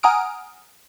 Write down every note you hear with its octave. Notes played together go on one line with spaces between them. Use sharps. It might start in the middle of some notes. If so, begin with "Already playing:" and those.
F#5 G#5 A#5 D#6 F6 D7